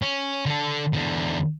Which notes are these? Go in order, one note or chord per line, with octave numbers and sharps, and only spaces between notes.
C#4
D3 A4
E2 D3